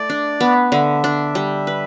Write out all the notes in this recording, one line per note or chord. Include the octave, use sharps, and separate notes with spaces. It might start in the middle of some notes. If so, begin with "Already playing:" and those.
Already playing: A3 E4 D5
D4
B3
D3 E5
D4
G3
B4